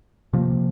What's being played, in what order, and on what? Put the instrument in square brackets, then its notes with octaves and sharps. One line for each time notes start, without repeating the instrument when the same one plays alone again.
[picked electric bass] C3 F3 A#3